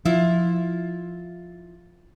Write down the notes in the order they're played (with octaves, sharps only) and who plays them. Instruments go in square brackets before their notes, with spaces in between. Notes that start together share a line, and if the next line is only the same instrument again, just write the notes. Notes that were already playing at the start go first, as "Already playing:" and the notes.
[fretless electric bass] F3 [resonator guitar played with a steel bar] E4 F4